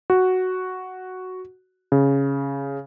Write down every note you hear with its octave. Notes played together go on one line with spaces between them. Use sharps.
F#4
C#3